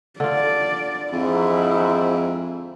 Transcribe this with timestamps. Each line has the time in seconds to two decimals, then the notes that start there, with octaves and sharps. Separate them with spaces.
0.20 D3 F4 D5
1.12 F2 G#2 E4